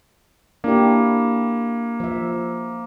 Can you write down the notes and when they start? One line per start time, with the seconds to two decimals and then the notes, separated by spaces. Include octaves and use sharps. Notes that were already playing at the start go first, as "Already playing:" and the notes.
0.64 A#3 D4 E4 G4
2.00 F3 E5